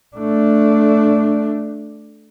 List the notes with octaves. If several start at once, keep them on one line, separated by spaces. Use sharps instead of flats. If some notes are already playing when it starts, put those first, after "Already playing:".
A3 D4